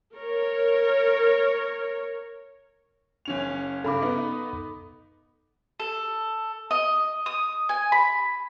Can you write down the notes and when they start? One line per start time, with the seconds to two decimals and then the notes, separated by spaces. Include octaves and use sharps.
0.14 A#4 C#5
3.25 F#1 C#4 F7
3.84 G2 C#3 A4 B5 D6
4.02 B3 D#4
5.80 A4
6.71 D#5
7.26 D#6
7.69 G#5
7.92 B5